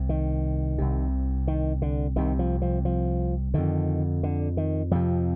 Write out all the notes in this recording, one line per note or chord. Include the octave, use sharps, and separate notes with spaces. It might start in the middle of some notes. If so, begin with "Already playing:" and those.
Already playing: C2 C3
D#3
C2 C3
D#3
D3
C2 C3 D#3
F3
F3
F3
F2 D3 D#3
D3
D#3
F2 C3 F3